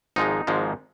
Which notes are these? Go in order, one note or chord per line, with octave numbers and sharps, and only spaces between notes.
G#1 G#2 F3 G#3 D#4
G#1 G#2 F3 G#3